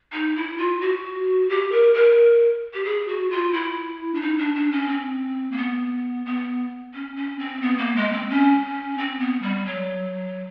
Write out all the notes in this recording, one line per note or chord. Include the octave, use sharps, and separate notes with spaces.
D#4
E4
F4
F#4
G4
A#4
A#4
G4
G#4
F#4
F4
E4
D4
D#4
D4
D4
C#4
C4
A#3
B3
B3
C#4
C#4
C4
B3
A#3
G#3
C4
C#4
C4
B3
G3
F#3